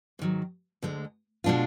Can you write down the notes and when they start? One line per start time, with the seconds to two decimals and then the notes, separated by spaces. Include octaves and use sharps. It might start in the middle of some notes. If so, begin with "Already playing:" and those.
0.19 G#2 D#3 F#3
0.83 D2 D3 G#3
1.44 B2 G#3 D4 F4